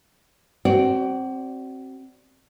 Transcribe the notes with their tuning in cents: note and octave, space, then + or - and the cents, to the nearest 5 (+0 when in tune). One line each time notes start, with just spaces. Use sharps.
C4 +20 F#4 +35 D5 +0